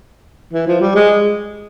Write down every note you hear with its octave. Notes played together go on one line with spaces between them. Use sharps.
E3
F3
G3
G#3